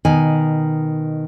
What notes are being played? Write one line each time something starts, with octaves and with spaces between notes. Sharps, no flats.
B2 D#3 G#5